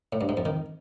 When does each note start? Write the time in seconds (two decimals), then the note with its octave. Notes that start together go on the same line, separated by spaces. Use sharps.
0.13 A2
0.21 G2
0.29 G#2
0.37 F2
0.45 D#3